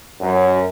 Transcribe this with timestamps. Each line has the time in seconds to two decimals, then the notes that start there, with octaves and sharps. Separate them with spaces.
0.21 F#2